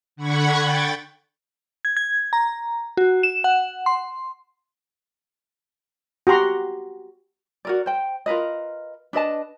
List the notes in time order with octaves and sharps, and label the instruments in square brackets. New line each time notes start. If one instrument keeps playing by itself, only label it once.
[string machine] D3 F#5 B5 C#6 G#6
G5 A6
[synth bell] G#6
G#6
A#5
F#4
E7
F#5
C6
[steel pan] F#4 G4 A#5 C6
[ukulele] F#4 A#4 D5
C5 G5
F4 A#4 B4 D#5
D4 B4 D#5 A5